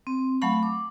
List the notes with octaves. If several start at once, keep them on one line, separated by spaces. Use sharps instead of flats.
C4
F#3 A3 F5 F#5 B5 C#6
D6